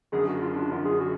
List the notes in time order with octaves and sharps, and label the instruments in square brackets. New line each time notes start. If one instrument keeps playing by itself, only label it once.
[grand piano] F#1 F#2 D3 [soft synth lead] G#4
[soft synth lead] F#4
F4
F4
D4
[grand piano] F#1 F#2 D3 [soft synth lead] F4
[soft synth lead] G#4
F#4